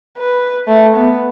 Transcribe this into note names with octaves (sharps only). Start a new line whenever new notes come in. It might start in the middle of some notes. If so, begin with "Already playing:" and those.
B4
A3
B3